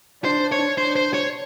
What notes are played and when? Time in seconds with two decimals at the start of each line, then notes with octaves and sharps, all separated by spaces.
0.24 D4 C5
0.52 C#5
0.78 D4 C5
0.96 C5
1.14 C#5